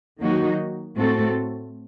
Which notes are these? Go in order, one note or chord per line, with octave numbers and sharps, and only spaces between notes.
D#3 F#3 A#3 D#4 F#4
A2 A3 C4 F#4 A4